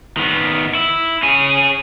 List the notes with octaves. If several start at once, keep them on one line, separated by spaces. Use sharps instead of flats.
D#3 B3
E4
C#4 G#4